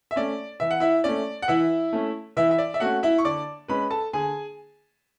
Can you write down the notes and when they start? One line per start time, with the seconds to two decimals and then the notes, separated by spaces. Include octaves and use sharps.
0.11 E5
0.16 A3 C#4 D5
0.60 E3 E5
0.71 F#5
0.80 E4 E5
1.04 A3 C#4 D5
1.42 F#5
1.48 E3 E4 E5
1.93 A3 C#4
2.37 E3 E4 E5
2.51 E5
2.58 D5
2.74 E5
2.80 A3 C#4 F#4 F#5
3.03 E4 E5
3.18 C#6
3.25 D3 D5 D6
3.68 G#3 C#4 B4 B5
3.90 A4 A5
4.13 D3 G#4 G#5